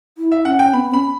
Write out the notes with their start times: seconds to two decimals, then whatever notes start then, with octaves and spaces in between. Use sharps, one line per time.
0.18 E4
0.32 E5
0.45 C#4 F#5
0.59 G5
0.73 B3 B5
0.92 C#4 B5